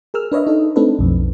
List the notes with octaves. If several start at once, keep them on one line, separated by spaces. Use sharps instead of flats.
G#4 A#4 E6 F6
D4 B4 C#5 D#5 E5
D#4 A4 D#5
A3 C4 D4 D#4 A4 B4
B1 F2